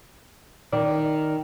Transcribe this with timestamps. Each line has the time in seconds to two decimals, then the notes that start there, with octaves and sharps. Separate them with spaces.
0.72 D#3 D5